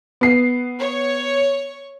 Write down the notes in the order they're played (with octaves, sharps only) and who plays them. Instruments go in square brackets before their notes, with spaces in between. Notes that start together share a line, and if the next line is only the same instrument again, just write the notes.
[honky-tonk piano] B3 C7
[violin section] C#5